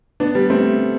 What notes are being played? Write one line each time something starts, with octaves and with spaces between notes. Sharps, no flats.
B3 D4
G3 B3
A3 C4